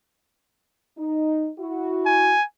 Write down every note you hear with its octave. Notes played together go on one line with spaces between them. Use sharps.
D#4
E4 F#4
G#5